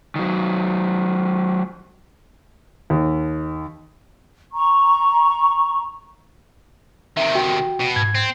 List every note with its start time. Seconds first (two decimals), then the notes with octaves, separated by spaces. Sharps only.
0.16 D#3 F#3
2.90 D#2
4.52 A#5 C#6
7.17 C3 D#3 E5
7.35 F#4 G5
7.80 B2
7.96 G#2 G#6
8.15 C4